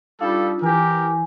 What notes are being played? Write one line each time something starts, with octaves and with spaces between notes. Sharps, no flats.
G3 D4 D#4 F4 A4 F5
E3 E4 G4 A#4 G#5